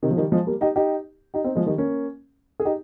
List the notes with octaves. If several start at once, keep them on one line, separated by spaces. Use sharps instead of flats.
C3 D#3
F3
D#3 G3
F3 G#3
G3 A#3
D#4 G4
D#4 G4
D#4 G4
C4 D#4
F3 G#3
D#3 G3
A#3 C#4
G#4
D#4 G4